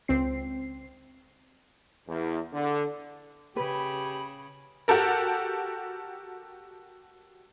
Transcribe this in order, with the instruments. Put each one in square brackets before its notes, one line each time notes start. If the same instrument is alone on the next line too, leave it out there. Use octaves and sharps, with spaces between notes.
[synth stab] C#2 C4 C7
[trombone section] E2
D3
[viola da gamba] C#3 [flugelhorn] G4 [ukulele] B4 [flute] B5
[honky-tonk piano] F#4 G4 A4 A#4